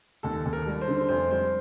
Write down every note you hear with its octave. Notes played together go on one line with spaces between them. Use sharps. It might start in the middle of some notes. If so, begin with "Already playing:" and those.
D#2 A4
D#2
A#4
G3
C5
D3
F1 C5
G3 C5